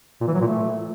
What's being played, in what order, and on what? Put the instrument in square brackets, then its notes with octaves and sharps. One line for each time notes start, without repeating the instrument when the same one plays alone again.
[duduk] A#2
E3
F#3
A#2
A3